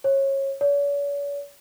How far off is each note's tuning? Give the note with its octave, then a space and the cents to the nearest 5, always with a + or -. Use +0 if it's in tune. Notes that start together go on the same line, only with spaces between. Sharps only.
C#5 -25
C#5 +45